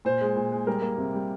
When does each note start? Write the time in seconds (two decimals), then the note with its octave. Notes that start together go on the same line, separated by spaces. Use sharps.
0.05 A#2 C5
0.21 G#3
0.36 A#2
0.52 G#3
0.67 G3 A#4
0.82 A#3
0.98 C3
1.14 G3